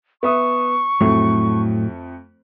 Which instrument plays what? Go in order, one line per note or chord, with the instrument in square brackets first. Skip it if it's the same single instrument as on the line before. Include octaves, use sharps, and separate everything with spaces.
[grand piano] B3 E5 D#6 [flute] C#6
[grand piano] F2 A3 [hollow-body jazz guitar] A2 F#3